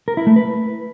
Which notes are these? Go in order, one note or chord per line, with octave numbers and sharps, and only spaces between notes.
A#4
E4
A3
B4